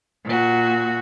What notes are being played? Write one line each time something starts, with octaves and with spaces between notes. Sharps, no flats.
A#2 F#4